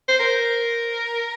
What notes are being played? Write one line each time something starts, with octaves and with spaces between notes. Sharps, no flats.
C5
A#4